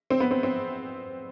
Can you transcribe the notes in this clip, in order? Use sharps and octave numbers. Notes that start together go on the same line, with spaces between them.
C4
B3
C4
C4